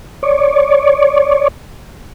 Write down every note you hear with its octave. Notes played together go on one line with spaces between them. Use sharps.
C#5 D5